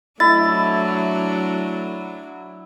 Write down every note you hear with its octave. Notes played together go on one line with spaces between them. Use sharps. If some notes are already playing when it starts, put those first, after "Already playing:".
F#3 A3 D4 E4 A6